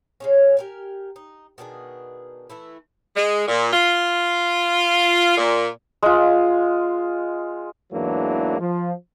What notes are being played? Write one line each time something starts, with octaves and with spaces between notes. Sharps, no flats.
C#3 G#3 C#4
G4 A#4 G#5
D#4
B2 D#3 D4 G#4
E3 A3 E4
G#3
A#2
F4
A#2
G#3 F4
E2 G#2 E3 F#3 A#3 D4
F3